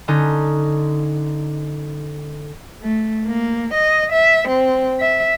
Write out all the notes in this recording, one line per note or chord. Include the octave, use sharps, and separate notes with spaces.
D3 C#4 D#4
A3
A#3
D#5
E5
C4
E5